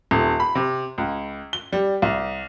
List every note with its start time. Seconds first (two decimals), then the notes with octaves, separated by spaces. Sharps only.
0.11 D#1
0.40 B5
0.55 C3
0.98 C#2
1.53 G7
1.73 G3
2.02 C2